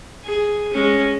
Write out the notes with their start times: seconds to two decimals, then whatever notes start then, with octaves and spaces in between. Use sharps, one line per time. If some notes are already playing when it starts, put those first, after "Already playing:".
0.24 G#4
0.73 G#3 C#4